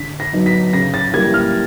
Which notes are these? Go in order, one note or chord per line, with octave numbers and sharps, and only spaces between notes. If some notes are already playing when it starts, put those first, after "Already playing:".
Already playing: D3 B6
A#6
F#3 B3 D#4
B6
C#3 A#6
A6
E3 G3 A#3 G#6
F6